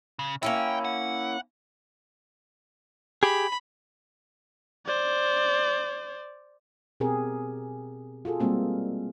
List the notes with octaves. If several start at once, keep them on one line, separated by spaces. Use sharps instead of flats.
C#3
A#3 C#4 E4 G5
F#5
G4 G#4 B5
C5 D5
B2 C4 G4 G#4 A#4
F4 F#4 G#4 A4
G3 G#3 A#3 C4 F#4